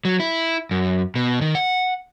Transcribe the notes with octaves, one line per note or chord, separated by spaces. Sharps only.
F#3
E4
F#2
B2
D#3
F#5